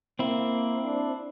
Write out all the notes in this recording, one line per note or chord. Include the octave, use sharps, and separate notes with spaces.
A#3 C4 E4
D4